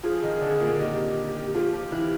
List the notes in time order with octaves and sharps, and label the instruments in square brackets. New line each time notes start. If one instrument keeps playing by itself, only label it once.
[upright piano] F3 F4 [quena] G#4
[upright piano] D#3 D#4
D3 D4
A#2 A#3
[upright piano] D#3 D#4 [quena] G4
[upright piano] F3 F4 [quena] G4 G#4
[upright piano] F3 F4
E3 E4